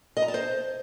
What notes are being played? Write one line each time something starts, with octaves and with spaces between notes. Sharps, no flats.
D#5
A#5
A5
C5